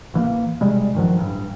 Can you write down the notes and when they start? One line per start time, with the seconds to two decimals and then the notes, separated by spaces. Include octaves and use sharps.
0.14 A1 E3 A3 A#3
0.61 E1 C3 G3 G#3
0.95 G2 D#3 F3 F#3
1.18 A1 G2